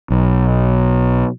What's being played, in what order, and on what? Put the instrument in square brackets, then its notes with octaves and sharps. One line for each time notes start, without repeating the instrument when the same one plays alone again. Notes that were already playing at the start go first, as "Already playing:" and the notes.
[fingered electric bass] B1